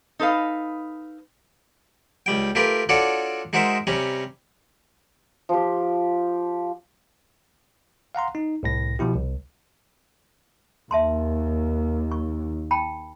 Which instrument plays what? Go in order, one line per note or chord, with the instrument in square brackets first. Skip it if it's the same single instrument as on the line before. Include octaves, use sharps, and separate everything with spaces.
[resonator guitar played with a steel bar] D#4 A4 B4 F5
[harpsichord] C#2 G3 G5
A3 F4 G4 A#4 B4 G5
D4 F4 F#4 A4 C#5 D5
G#3 D#4 F#4 A#4 C5 E5
C3 G3 C#4 A#5
[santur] F3 G4
[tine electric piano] F5 F#5 A#5 C6
D#4
C2 A2 A#6
B2 F3 E4 G4
C2
[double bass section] D#2 [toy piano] E5 A5 C6
[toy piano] C#6
G5 A5 B5